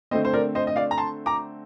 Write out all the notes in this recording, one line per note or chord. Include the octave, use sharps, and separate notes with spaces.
D3 A3 C4 C5 D#5
C5
A#4 D5
C5 D#5
D#5
D5 F5
A#5
A5 C6
A#5 D6